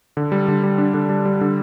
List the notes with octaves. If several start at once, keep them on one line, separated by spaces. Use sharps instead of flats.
D3
G3
D3
G3
D4
D3
G3
G3
D3